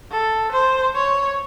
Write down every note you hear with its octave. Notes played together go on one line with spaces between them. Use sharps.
A4
C5
C#5